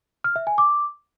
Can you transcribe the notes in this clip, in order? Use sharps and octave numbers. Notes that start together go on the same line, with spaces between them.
F6
E5
G#5
D6